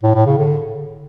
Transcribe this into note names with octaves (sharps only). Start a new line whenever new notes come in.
A2
A2
C#3
D3